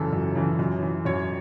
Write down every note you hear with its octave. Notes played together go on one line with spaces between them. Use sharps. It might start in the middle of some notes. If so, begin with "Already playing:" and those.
Already playing: F#2 C#3 E3 A4
F#2
C#3 E3
F#2
E3
F#2 C#5